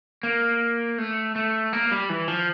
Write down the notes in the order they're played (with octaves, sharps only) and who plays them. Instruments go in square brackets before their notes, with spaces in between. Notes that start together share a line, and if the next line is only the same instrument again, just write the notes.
[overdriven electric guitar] A#3
A3
A3
A#3
G3
E3
F3